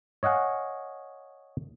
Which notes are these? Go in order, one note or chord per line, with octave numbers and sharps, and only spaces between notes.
C#5 D#5 F5 F#5 G#5